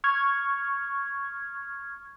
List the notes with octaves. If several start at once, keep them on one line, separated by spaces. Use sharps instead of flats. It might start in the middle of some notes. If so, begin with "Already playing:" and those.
C#6 F6 G#6